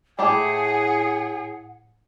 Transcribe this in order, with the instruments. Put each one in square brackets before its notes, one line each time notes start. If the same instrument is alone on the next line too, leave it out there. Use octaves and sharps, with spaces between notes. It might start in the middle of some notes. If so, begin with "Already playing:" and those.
[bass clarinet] A2 [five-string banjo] A3 E4 G4 [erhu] G#4 [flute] F#5